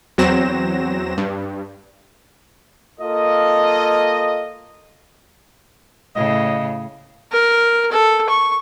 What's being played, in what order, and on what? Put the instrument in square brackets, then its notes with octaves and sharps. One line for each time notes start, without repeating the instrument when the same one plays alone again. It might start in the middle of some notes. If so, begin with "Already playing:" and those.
[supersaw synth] E2 F#3 C4 A#6 E7
G2
[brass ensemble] A#3 F4 A4 D#5
[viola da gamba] A2 C#3 [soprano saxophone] D#5
[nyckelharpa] A#4
A4
C#6